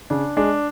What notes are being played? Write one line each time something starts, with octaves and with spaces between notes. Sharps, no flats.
C#3 D4
G#3 D4